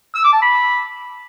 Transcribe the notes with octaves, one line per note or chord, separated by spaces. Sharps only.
E6
D6
A5
B5